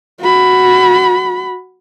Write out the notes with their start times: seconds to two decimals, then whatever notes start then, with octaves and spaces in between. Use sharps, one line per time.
0.20 F#4 B5